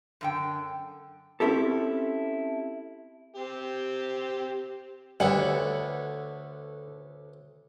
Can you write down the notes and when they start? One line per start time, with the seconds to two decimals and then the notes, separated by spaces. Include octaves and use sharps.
0.21 F#2 D3 G5
1.40 C4 C#4 E4 G4 A4
3.36 C4 G4
5.20 D2 D3 G3 A4 B4 C#5 F#5